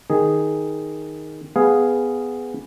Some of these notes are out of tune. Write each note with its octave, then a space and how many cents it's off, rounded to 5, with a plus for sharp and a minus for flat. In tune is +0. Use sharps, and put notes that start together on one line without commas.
D#3 +0 G#4 +0
B3 +10 G#4 +0 F5 +0